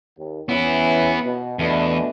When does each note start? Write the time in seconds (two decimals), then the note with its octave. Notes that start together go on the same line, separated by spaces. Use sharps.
0.17 D#2
0.49 E3 B3 C#4 E4
1.25 B2
1.59 E2 B2 A3 D4